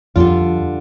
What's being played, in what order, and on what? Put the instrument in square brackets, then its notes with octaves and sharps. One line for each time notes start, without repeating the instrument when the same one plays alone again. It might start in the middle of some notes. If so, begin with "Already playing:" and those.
[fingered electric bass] F2 [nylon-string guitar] D3 G3 D4 F4